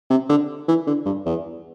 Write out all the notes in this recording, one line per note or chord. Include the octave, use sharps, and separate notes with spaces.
C3
D3
E3
D3
G2
E2